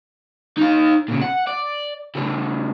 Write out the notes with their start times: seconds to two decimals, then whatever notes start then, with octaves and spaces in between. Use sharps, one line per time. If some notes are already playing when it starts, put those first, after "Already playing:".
0.58 D#4 F5
1.08 A#2 C#3
1.22 F#5
1.47 D5
2.15 C#3 A3